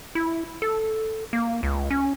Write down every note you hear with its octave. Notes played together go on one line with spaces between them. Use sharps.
E4
A4
A#3
C#2
C#4